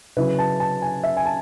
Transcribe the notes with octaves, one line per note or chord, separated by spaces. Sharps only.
C#3 F#3 C#4 E4 B4
A5
A5
G#5
E5
G#5
A5